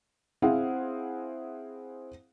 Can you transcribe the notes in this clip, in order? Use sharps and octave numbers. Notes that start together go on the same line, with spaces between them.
C4 E4 G#4 C5 F5 F#5